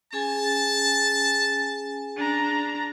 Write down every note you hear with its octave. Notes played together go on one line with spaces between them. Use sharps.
C#4 G#4 G#5 A5
D4 A#5